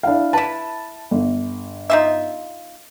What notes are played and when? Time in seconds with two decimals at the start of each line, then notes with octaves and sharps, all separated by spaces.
0.03 D4 E4 F5
0.33 E4 B4 A5
1.11 G1
1.90 D#4 F4 E5